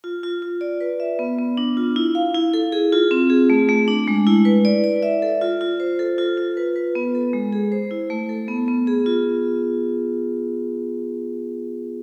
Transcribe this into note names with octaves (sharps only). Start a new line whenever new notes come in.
F4
F4
F4
D5
B4
E5
B3
B3
D4
F4
E4
F5
E4
A4
G#4
F4
C4
G#4
A3
A3
D4
G#3
E4
B4
D5
D5
E5
A4
F4
F4
C5
A4
F4
F4
B4
B4
B3
A4
G#3
G#4
C5
E4
A3
A4
B3
B3
G#4
F4